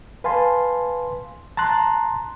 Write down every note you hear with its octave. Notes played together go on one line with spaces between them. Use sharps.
B4 F5 G#5 A5 C6
A5 A#5 C6 F#6